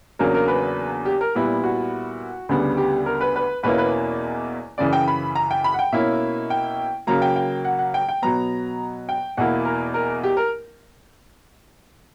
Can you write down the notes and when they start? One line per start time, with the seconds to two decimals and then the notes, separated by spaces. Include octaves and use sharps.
0.19 E2 C#3 F#3 A#3 D4 A#4
0.34 A#4
0.48 B4
1.05 G4
1.21 A#4
1.35 A#2 G3 B3 E4
1.64 F#4
2.49 D2 C#3 G3 B3 D4
2.77 G4
3.06 A#4
3.21 B4
3.36 B4
3.63 E2 B2 A#3 C#4 E4 B4
3.78 B4
4.78 F#2 C#3 E3 D5
4.93 G5
5.08 B5
5.35 A#5
5.51 G5
5.64 B5
5.74 F#5
5.79 G5
5.92 B2 A#3 C#4 E4 E5
6.50 G5
7.07 C#3 F#3 A#3 A#5
7.22 G5
7.36 G5
7.65 F#5
7.79 F#5
7.94 G5
8.09 G5
8.22 B2 F#3 B3 A#5
9.09 G5
9.37 E2 B2 A#3 E4 F#5
9.65 A#4
9.94 A#4
10.23 G4
10.37 A#4